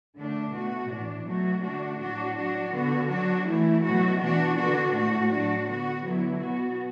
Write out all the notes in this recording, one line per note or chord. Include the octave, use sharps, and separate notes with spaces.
D3 A3 D4
B2 A3 F#4
A2 E3 D4
B2 F#3 A3 F#4
D3 A3 D4 F#4
A2 F#3 D4 F#4
F#3 D4 F#4
D3 B3 F#4
F#3 D4 F#4
E3 A3 E4
B2 F#3 A3 F#4
E3 D4 F#4
D3 B3 D4 F#4
A2 A3 F#4
F#3 D4 F#4
D3 B3 F#4
D3 F#3 B3 E4
B2 B3 F#4